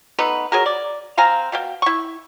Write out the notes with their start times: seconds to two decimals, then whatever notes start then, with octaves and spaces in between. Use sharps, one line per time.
0.19 A3 B3 D#4 B4
0.52 F#3 G#4 A#4
0.66 D5
1.17 C4 F5 G#5 A#5
1.52 B2 F5 G5
1.82 E4 C#6